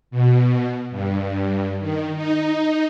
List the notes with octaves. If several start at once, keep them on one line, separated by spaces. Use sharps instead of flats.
B2
G2
D#3
D#4